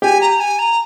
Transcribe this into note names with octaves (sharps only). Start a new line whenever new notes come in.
G4 G#5
A#5
G#5
A#5